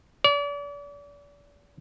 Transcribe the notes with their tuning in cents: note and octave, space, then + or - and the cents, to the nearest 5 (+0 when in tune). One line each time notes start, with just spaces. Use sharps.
D5 -40